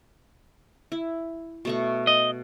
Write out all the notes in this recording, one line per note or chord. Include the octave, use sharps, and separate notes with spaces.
E4
B2 A3 C#6
D#5